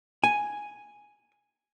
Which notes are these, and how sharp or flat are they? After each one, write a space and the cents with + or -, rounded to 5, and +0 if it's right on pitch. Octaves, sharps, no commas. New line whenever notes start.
G#5 +0